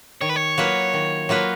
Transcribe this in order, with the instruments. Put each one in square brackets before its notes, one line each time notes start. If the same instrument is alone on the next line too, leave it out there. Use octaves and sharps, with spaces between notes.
[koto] D#3 [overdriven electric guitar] C#5
[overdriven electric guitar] B4
C#5
[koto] F#3 A#3 F4 B4
D#3
F#3 A#3 F4 B4